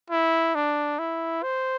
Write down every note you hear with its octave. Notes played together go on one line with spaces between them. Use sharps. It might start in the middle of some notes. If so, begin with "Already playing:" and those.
E4
D4
E4
C5